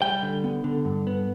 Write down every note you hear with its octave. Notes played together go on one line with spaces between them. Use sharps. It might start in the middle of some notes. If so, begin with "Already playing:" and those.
G3 G5
D3
B3
D3
G2
B3